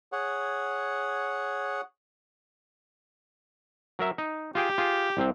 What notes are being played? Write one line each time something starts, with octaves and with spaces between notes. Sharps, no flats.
G#4 C#5 F#5
F#3 A#4 E5
D#4
F4 G4 G#4 G5
F4 G#4
C2 C3 C4